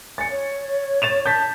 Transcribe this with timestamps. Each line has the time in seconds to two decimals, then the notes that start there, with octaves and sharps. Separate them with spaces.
0.18 G#5 A6 C#7
0.30 C#5
1.02 A6 E7 F7
1.26 A5 G6 A6 B6